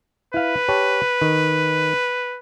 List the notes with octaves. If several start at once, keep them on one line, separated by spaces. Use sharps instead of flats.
E4 B4 F5
G4 C#5 A5
D#3